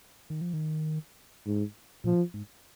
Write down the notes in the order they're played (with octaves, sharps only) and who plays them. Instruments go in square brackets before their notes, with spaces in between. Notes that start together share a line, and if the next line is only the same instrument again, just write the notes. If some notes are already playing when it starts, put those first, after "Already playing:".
[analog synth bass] D#3
F3
D#3
[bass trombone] G#2
[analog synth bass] A#2 [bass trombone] F3
[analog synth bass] G#2